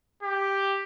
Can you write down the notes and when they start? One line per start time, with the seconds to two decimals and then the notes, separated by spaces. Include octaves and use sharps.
0.23 G4